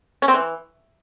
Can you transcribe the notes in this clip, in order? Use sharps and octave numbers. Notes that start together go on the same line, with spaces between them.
C#4
C4
E3